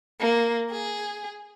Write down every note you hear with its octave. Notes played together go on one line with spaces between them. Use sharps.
A#3
G#4